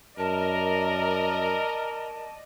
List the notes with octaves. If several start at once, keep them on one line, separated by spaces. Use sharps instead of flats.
F#2 A#4 D5 D#5 A5